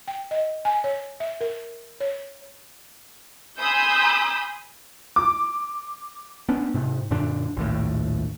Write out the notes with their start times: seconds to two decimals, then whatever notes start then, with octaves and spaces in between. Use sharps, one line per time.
0.08 G5
0.31 D#5
0.65 G#5
0.84 C#5
1.20 E5
1.41 A#4
2.00 C#5
3.58 G#5 B5 C6 D#6 E6 G6
5.16 D6
6.49 B3 C#4 D4
6.74 G#2 C3
7.11 F#2 A#2 D3 D4
7.57 A#1 D#2 A2